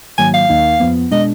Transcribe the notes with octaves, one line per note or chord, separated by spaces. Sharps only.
G#2 D#3 F#3 A#3 G#5
F5
D#2 D#3 A#3 D#4
F2 F3 B3
B2 G#3 D4 D#5